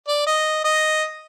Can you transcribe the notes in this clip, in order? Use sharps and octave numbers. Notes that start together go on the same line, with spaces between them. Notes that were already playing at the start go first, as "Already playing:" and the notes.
D5
D#5
D#5